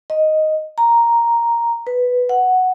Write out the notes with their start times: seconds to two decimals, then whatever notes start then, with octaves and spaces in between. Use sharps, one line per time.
0.10 D#5
0.78 A#5
1.87 B4
2.29 F#5